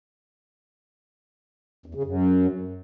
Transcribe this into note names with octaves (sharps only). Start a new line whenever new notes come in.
E2
C#3
F#2